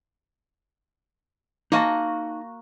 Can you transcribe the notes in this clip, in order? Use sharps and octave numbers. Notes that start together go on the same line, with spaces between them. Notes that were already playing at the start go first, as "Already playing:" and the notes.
A#3 D#4 F#4 D#5 A5